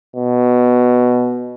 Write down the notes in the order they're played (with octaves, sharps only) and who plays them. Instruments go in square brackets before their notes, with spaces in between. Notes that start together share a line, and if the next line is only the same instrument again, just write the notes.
[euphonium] B2